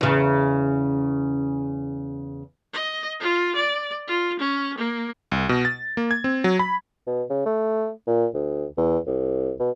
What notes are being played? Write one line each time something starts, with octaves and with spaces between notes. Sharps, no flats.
E2 C#3
D#5
F4
D5
F4
C#4
A#3
C2
B2
A6
A#3
G#6
C4
F#3
B5
B2
C#3
A3
A#2
D2
E2
C2
B2